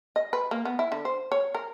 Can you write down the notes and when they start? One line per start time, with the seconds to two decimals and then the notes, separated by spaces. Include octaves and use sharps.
0.16 D#5
0.33 B4
0.51 A#3
0.65 B3
0.79 E4
0.92 D3
1.05 C5
1.32 C#5
1.55 A#4